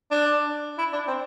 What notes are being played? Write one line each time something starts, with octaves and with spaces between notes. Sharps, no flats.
D4
E4
D4
C4